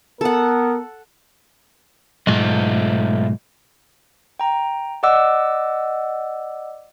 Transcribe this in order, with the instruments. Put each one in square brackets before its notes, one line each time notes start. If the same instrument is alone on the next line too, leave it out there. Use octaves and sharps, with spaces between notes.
[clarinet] B3 [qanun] A4 F#5 [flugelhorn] A#4
[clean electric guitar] B1 G#2 [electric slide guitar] A3 F4 D#5
[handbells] G5 A#5
D5 D#5 F#5 D6 E6